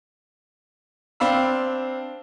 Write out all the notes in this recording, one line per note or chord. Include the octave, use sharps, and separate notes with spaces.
C4 D4 F5 B5 E6